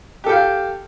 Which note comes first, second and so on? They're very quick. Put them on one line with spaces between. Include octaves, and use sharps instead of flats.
G4 A4 G5 F5